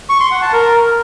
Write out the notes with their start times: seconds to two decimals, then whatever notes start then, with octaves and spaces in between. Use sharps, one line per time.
0.09 C#6
0.20 C6
0.31 F#5
0.42 A5
0.53 A#4